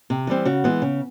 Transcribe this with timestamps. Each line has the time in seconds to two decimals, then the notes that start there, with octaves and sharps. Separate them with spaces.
0.10 C3
0.27 E3 G3 C4
0.45 C#3 F#4
0.64 E3 G#3 B3
0.82 C#3